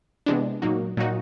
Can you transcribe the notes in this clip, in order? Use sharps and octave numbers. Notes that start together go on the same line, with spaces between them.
C3 E3 G#3 B3 D4
A#2 F#3 A#3 D#4 F#4
A#2 F#3 A#3 D#4 F#4